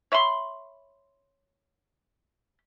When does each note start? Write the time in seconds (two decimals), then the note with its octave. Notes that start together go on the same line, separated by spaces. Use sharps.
0.12 C#5 E5 B5 C6